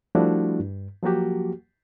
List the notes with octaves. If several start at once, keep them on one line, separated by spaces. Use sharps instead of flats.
F3 G3 A3 D4 E4 F#4
G2
F3 F#3 A#3 F#4 G4